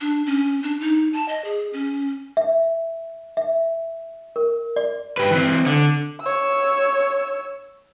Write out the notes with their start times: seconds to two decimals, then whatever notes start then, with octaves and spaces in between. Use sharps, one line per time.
0.01 D4
0.26 C#4
0.63 D4
0.80 D#4
1.13 A5
1.28 D#5
1.44 G#4
1.73 C#4
2.37 E5
3.37 E5
4.36 A#4
4.76 D5
5.17 G4 B4
5.31 E3 C4
5.67 D3
6.21 C#5 E6